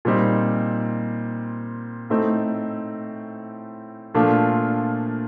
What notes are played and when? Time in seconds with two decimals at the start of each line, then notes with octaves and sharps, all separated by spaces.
0.05 A#2 G3 C4 D#4
2.10 A2 A3 C4 D#4
4.14 A#2 F3 A3 D4 F4